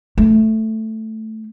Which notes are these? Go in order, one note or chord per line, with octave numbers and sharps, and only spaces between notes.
A3